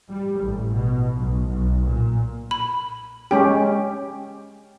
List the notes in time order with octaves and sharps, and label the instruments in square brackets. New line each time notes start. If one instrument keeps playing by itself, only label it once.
[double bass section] G3
A1
B2
B1
B1
A#2
[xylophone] B5
[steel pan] G#3 C#4 G4 [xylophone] G5